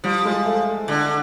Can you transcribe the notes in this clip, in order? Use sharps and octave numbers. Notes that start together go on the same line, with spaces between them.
F3 G3
G#3
A3
D3 D4